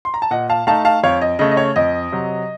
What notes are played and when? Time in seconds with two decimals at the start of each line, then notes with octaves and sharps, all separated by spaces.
0.05 C6
0.14 A#5
0.22 A5
0.31 A#2 D#5 F#5
0.49 F5 A5
0.67 A3 D#4 F5 A5
0.85 F5 A5
1.03 F2 C#5 F5
1.22 D#5
1.39 C#3 A3 D#5
1.51 D#5
1.57 C#5
1.76 F2 D#5
2.12 C3 F#3